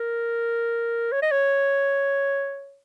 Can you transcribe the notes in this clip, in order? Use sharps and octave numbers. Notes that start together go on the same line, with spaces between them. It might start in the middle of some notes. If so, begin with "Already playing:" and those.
Already playing: A#4
C#5
D#5
C#5